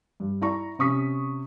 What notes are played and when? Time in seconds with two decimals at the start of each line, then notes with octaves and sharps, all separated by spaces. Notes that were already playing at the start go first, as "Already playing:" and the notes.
0.20 G2
0.41 E4 D5 A#5 C#6
0.79 C3 C#4 C#6 D#6 B6